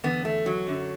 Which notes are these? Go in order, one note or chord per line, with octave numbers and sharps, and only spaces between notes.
E2 D3 B3
A3
F#3
F#2 D3